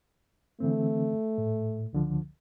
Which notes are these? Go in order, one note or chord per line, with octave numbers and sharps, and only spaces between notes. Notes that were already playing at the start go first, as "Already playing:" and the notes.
D3 E3 A3 C4
A2
C#2 D3 F3